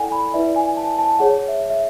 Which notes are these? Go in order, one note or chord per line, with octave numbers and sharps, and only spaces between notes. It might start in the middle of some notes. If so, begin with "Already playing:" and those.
Already playing: E4 A4 D5 F#5 G#5
B5
E4 B4 D5 E5
G#5
A5
A5
G#4 C#5 F#5
E5
E5